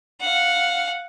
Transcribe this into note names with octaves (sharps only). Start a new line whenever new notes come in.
F5 F#5